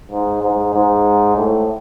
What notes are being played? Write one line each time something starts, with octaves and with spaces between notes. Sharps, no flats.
G#2
G#2
G#2
A2